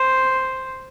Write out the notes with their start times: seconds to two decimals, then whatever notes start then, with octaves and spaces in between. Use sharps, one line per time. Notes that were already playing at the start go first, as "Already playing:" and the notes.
Already playing: C5